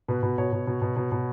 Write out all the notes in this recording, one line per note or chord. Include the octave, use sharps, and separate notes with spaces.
B2 B4
B2
B2 C#5
B2
B2
B2
B2
B2